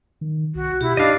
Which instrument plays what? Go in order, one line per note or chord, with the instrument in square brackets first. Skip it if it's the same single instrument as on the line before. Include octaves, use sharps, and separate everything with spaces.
[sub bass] D#3
[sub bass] C2 [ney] F#4
[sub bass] B2 [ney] E4 [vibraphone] G4
[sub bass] F#2 [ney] D4 [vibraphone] D#4 [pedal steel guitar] D#5 F5